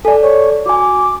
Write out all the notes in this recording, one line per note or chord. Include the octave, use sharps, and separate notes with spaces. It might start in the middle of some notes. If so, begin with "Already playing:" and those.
A4 D5 G#5
C#5
F#4 G#5 D6